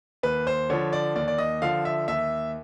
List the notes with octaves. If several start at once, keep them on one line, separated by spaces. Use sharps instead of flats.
D#2 B4
C5
D3 F3 C#5
D5
D#2 D5
D5
D#5
D3 F3 F5
E5
D#2 E5